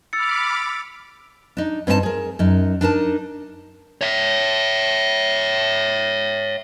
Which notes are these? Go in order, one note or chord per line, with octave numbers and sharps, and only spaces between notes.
B5 D6 E6 F6 A6 C#7
D4 D#4
G2 C4 D#4 G4 A5
G#4 A#4
F#2 D#4
D4 D#4 A#4 A5
C#5 E5